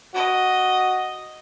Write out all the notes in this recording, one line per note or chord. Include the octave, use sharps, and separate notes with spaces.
F#4 D#5